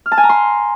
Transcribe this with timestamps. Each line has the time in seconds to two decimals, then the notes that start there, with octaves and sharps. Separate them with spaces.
0.06 F6
0.12 A5
0.18 G#5
0.23 A#5
0.29 C6